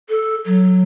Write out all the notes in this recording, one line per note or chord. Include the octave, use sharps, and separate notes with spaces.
A4
F#3